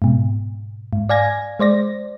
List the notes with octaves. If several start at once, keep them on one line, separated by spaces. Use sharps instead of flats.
G#2 B2
G#2
D5 F5 G#5 G#6 A#6
G#3 C5 D5 A#6